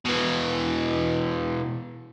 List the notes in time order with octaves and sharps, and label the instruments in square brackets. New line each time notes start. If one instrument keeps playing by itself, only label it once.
[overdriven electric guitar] B2 E3